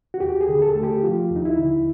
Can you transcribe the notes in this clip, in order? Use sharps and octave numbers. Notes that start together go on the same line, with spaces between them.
F#4
D#2 G4
G#4
D3
A4
A3
G4
F3 F4
D#2 D#4
E4
D3